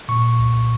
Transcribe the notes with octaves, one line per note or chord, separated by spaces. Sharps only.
A#2 C#6
C2